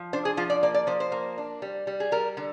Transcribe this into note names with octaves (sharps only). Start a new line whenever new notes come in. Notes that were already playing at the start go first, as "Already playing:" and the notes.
Already playing: F3
D4 C5
G#4
F3 F4
D5
A#3 D5
D5
F3 C5
C5
A#3
D4
G3
G3
G#4
G3 A#4
D3